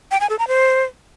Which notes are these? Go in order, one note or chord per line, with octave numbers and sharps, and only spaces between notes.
G5
G#5
A4
A#5
C5